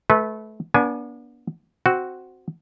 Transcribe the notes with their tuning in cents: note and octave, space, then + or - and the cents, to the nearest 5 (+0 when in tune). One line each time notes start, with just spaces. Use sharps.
A3 -25 B4 +0
B3 -40 D4 -25 G#5 +5
C4 +0 F#4 +0